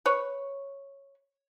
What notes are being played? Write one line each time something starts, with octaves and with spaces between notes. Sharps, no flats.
B4 C#5